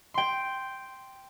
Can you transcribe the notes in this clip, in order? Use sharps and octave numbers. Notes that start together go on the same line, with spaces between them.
G5 C6